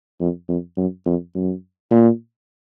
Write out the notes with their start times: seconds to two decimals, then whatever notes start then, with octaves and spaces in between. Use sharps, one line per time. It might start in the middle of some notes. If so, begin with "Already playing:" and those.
0.20 F2
0.49 F2
0.77 F#2
1.06 F2
1.35 F#2
1.91 A#2